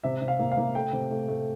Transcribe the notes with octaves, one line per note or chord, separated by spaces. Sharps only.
C3 E5
C3
F5
A#3
F5
A#3
A3 G5
C3
A3
A3